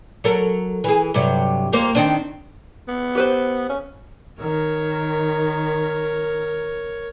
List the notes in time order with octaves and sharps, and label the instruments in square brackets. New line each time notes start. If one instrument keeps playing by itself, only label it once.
[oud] F#3 A4 A#4
E3 G#4
G2 C3 F#3
F2 A#3 C5
D#3 C4 D4
[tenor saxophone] B3
[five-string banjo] G4 B4 C5
[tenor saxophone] C#4
[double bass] D#3 [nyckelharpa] A#4 C#5